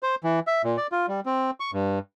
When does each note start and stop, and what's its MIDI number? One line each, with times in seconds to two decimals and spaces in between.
0.03 0.15 72
0.24 0.40 52
0.47 0.62 76
0.64 0.77 46
0.77 0.87 74
0.92 1.06 65
1.08 1.20 55
1.26 1.51 60
1.60 1.71 85
1.73 1.99 43